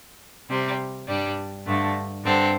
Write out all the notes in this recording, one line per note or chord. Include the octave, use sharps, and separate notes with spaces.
C3 G3 C4
G2 G3 D4
G2 D3 A3
G2 D3 C4 A4